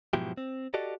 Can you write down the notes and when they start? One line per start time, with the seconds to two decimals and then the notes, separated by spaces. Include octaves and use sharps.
0.13 G#2 B2 F3 F#3 E4 G4
0.37 C4
0.74 F#4 G4 A4 D5 D#5